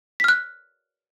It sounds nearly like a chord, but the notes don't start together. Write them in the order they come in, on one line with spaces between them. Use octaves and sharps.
B6 F6 F#6